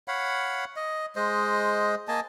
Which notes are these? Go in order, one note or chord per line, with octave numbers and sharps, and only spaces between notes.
C#5 F5 F#5 B5
D#5
G#3 C5 D#5
A#3 D#5 G#5 A5